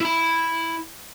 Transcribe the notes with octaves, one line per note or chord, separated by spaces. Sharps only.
E4 B5